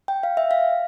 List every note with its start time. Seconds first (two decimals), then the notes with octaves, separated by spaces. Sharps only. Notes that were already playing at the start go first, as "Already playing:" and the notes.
0.08 G5
0.23 F5
0.37 E5
0.51 F5